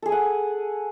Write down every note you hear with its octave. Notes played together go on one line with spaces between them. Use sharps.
G#4 A4 F#5 G#5